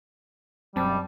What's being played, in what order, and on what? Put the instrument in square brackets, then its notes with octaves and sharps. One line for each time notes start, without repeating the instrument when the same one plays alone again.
[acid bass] E1 [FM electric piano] F#2 C4 A5 [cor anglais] G3